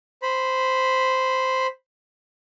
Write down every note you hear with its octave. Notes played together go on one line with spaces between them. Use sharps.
C5 B5